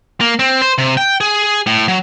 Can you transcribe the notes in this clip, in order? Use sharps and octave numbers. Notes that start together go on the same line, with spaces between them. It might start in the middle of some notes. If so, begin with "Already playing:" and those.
A#3
C4
C5
C3
G5
G#4
A2
F#3